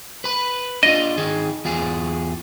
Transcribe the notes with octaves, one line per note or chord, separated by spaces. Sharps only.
B4 B5
D4 F4 D#5
D#3 G#4
E2 F4 G#4